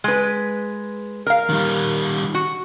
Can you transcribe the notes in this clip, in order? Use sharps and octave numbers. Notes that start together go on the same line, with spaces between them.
G#3 B4
A#4 F5
D#3 G3
F#4